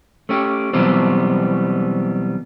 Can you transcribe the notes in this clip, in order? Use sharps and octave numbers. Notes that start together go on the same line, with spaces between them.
A3 C#4 G4
B2 E3 F#3 G3 B3 C4